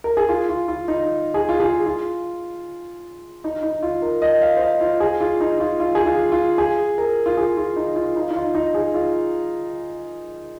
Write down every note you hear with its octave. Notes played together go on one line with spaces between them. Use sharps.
A#4
G#4
F4
F4
F4
D#4
G#4
F4
G#4
F4
D#4
D#4
F4
A#4
D#5
F5
C5
D#5
F4
G#4
F4
D#4
F4
F4
G#4
F4
F4
G#4
A#4
F4
G#4
F4
D#4
F4
D#4
D#4
F4
D#4
G#4
F4